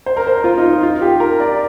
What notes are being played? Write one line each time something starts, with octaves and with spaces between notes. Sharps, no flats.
C5
A#4
C5
F4
D#4
F4
F4
G4
A#4
D5